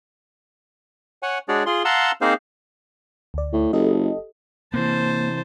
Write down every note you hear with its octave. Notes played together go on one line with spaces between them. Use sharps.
C#5 F#5 G#5
G#3 D4 F#4 G#4 C#5 D5
F4 G#4 C6
F5 F#5 A5 A#5 C6 E6
A#3 C4 D#4 G#4 C5 F5
D2 D5
A2
F#1 G4 A4 D#5
C3 E3 A#3 C5 A5